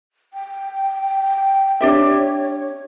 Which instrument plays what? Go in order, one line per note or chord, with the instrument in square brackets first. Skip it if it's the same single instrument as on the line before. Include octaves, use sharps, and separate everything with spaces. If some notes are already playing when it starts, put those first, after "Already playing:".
[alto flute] G5
[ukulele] D4 G4 E5 [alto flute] C#5